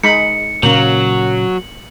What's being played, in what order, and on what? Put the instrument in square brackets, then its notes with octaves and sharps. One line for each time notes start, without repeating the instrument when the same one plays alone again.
[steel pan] G#3 D#4 B5 [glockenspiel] C#7
[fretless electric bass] A#2 C#3 C#4 [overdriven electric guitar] F#3 [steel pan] A#3 [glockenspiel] F#7